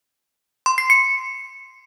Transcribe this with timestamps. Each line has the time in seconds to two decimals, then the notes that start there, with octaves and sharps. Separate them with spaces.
0.66 C6
0.78 C7
0.90 C#7